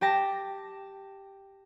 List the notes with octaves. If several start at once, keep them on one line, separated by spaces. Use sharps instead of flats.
G4 G5 A5 A#6